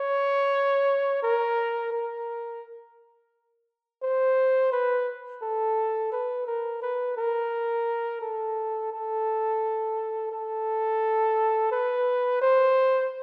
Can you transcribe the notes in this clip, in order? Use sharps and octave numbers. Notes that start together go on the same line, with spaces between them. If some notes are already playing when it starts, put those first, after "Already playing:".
Already playing: C#5
A#4
A#4
C5
B4
A4
B4
A#4
B4
A#4
A4
A4
A4
B4
C5